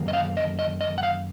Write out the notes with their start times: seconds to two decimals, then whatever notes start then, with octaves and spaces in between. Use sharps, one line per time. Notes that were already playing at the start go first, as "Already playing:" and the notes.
Already playing: F#2 D#3 A#3
0.08 D#5
0.13 F5
0.37 D#5
0.59 D#5
0.81 D#5
0.98 F#5
1.03 F5